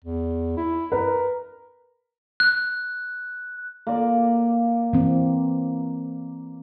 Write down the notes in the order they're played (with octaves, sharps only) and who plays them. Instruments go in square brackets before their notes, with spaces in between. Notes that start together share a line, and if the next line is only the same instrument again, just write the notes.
[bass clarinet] E2
E4
[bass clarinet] A#4 [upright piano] B4
[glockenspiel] F#6
[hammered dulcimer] A#3 D5
[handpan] E3 C4